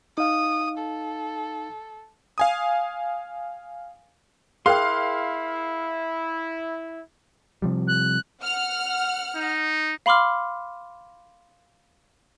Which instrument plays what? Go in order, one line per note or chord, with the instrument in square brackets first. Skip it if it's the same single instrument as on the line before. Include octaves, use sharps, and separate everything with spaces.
[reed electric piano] D#4 F5 [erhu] D#6
[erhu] A4
[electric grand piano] F5 G#5 D#6
[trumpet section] E4 [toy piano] G#4 A#4 G5 [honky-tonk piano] F5 [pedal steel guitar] C6 F#6
[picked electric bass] C3 F3 G3
[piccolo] F#6
[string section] F#5 F6
[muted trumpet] D#4
[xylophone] F5 B5 C6 D6 F6